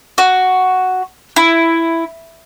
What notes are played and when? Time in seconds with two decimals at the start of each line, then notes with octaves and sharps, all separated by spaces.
0.18 F#4
1.36 E4